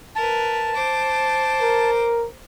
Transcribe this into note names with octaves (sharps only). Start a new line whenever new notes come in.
A#4 B4 A5
C5 D6
A#4